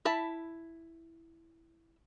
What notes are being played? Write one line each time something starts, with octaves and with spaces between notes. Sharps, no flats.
E4 A5 B5